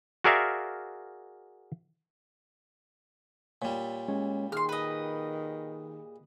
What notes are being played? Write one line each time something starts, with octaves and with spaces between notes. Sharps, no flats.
F#4 G#4 A#4 D5 E5 F5
A#2 G3 C#5
G#3 C#4 C#5
D#3 G#4 C6 F6
B4 D#5